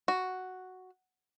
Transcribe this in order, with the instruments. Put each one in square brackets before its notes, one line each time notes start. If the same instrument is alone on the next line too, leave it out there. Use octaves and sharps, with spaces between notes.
[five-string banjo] F#4